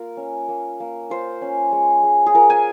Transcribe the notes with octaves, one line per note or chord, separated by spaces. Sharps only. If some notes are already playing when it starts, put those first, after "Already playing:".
Already playing: A#3 F4 A#4
C#4
A#3
A#3
F4 C5
C#4
G#3
G#3
G#4
F4 A#4
G#5